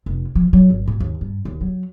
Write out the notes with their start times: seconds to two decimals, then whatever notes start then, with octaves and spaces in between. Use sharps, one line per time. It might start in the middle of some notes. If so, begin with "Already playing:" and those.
0.06 F1
0.35 F3
0.53 F#3
0.70 G#1
0.87 G#2
1.00 D#2
1.21 G2
1.45 D#2
1.61 F#3